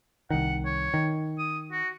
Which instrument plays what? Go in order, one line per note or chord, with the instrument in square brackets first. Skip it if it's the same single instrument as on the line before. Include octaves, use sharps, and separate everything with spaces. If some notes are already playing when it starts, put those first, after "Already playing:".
[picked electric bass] C2 D#3 [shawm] F#5
[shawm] C#5
[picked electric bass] D#3
[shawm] D#6
F#4